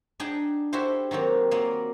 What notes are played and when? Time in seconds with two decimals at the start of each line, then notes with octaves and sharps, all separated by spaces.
0.20 D4 D#4 G#4 F#5 G5 A5
0.73 E4 F#4 G4 A4 C5
1.11 D#3 F#3 A#3 C4
1.51 F#3 A#3 A#4 D5 D#5 C6